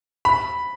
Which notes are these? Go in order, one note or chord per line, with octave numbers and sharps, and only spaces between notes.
B5